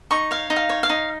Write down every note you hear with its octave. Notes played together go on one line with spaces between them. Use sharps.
D#4 C#6
C#5 F5
D#4
F5
C#5
F5
D#4